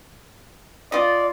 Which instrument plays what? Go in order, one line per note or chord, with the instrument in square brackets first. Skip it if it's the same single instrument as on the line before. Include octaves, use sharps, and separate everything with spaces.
[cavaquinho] F4 D#5 [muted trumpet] D5